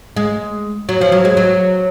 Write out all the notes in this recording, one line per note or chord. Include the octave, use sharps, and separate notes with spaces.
G#3
F#3
F3
F#3
G#3
F#3